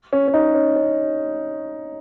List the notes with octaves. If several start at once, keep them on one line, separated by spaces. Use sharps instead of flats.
C#4
C#4
D#4
C#4
C#4